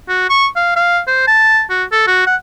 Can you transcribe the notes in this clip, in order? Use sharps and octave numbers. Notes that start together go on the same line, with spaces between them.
F#4
C#6
F5
F5
C5
A5
F#4
A4
F#4
F#5